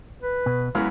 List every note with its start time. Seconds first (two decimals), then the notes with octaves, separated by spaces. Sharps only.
0.22 B4
0.46 B2
0.75 F#2 E3 G#3 B3 A#4 F5